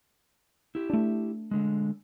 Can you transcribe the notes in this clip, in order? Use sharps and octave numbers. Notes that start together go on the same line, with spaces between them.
E4 G4
A3 D4
D3 G#3